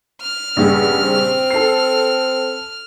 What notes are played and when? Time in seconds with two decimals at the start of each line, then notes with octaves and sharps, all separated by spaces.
0.22 F6
0.57 A#1 G2 C#3 B3
1.03 C4
1.51 A4 C7